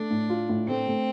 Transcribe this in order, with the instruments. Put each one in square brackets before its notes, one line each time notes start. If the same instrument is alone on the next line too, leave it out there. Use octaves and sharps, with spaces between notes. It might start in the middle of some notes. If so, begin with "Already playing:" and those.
Already playing: [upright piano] A3 [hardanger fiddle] D4
[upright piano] A2
F4
A2
[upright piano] A3 [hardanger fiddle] C4
[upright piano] A3